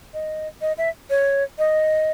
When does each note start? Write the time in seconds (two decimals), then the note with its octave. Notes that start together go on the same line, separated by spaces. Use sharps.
0.14 D#5
0.61 D#5
0.78 E5
1.10 C#5
1.59 D#5